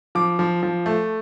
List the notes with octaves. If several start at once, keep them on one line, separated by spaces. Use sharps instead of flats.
F3 D6
F3
F3
A3